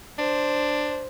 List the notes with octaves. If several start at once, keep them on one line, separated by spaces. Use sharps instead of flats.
D4 C5